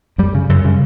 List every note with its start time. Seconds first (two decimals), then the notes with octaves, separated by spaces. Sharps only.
0.18 F#2 G3
0.35 C#3
0.49 F#2
0.65 C#3